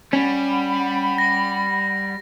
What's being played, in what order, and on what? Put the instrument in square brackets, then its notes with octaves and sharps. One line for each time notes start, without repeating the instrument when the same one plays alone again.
[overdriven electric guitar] G3 [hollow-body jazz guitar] C#4 [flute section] F#5 B5
[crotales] A#6